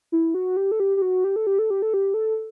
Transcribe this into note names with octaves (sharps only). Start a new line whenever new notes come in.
E4
F#4
G4
A4
G4
G4
F#4
G4
A4
G4
A4
G4
A4
G4
A4